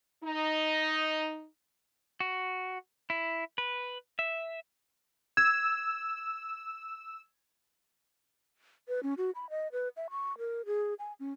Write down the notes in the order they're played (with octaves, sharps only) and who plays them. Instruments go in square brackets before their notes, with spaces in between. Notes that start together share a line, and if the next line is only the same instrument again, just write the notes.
[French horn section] D#4
[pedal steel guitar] F#4
E4
B4
E5
[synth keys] E6 [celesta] G#6
[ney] B4
C#4
F#4
B5
D#5
B4
E5
C#6
A#4
G#4
G#5
C#4